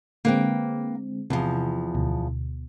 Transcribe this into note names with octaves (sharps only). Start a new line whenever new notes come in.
D3 G#3 A#3 C4 B4 G5
E2 C3 F3
D2 B2